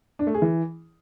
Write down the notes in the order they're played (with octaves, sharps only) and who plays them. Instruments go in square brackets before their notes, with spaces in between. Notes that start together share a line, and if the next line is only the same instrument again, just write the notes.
[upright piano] D4
A3
G#4
E3